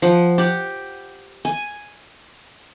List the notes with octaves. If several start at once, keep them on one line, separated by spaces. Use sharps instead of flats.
F3 F#5
G4 F#5
G#5